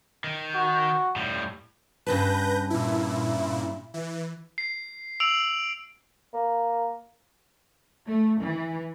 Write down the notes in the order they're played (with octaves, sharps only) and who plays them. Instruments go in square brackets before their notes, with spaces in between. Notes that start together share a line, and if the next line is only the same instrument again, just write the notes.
[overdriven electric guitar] D#3
[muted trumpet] F#4
[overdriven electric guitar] A2 G3
[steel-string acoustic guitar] G2 C#3 A5 [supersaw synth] B4 G6 A#6
[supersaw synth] A#2 E4
E3
[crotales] C7
E6 D7 F7 F#7
[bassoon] A#3
[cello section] A3
E3